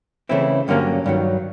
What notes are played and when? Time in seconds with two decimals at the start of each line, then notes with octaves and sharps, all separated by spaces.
0.29 C#3 E3 A3 C4 E4
0.68 G2 D3 F#3 A#3 C#4
1.06 G2 D#3 F#3